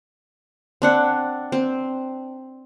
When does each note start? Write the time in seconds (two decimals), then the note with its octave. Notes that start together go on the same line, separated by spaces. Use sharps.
0.82 C4 D4 F#5
1.52 C4